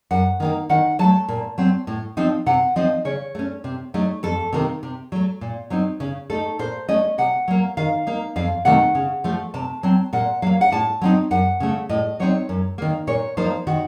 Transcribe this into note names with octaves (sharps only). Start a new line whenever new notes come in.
F#2 F#5
D#3 A#3 D#4
D#3 F#5
F#3 A3 A5
A#2
F#3 C4
A2
F3 C4 D#4
C3 F#5
F3 C4 D#4 D#5
C#3 C#5
A3 C#4
C3
F#3 A3 D#4
F2 A4
C3 D#3 A#3
C3
F#3 A3
A#2
F#3 C4 D#4
C#3
A3 D#4 A4
A#2 C5
A3 C#4 D#5
C3 F#5
F#3 A#3
D#3 F5
A#3 D#4
F2 F5
C3 D#3 A3 F#5
C#3
F3 A3
C3 A5
F#3 C4
A#2 F#5
F#3 A#3 F5
F#5
A2 A5
F#3 C4 D#4
F#2 F#5
C#3 A3
A2 D#5
F#3 C4 D#4 C#5
F#2
D#3 A#3
A#2 C#5
F3 A#3 D#4 C5
D#3 F#4